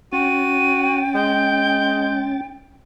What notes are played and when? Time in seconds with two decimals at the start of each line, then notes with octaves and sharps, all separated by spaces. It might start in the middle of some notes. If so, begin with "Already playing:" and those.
0.13 C#4 F#4 G5 A6 D#7
1.15 G#3 G6